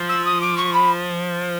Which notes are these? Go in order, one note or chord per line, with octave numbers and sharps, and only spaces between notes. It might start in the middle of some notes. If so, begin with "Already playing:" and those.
Already playing: F3
E6
D#6
D6
C#6
B5